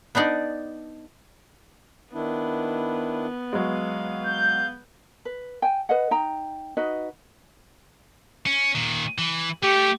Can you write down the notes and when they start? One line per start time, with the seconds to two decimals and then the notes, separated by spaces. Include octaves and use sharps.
0.15 B3 D4 D#4 D5
2.14 D#3 B3 D4 E4
3.53 F#3 G#3 F5
4.24 G6
5.25 B4
5.62 G5 G#5
5.89 B4 D#5 F#5
6.11 D#4 G5 A#5
6.77 D#4 F#4 B4 D#5
8.46 C#4
8.75 A#2 D#3
9.18 E3
9.63 A3 G4